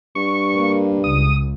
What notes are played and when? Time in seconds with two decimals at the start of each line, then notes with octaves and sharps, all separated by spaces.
0.15 G2 C#6
0.56 A#3
1.04 C#2 D#6